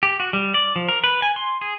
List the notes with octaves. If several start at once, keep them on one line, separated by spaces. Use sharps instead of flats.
G4
F#4
G3
D5
F3
A#4
B4
G#5
C6
G#4